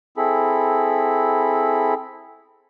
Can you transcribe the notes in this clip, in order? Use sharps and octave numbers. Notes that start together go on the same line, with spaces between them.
C4 E4 G#4 A4 B5